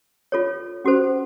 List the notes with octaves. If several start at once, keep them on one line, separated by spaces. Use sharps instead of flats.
F4 A4 C#5
C#4 F#4 A4 C5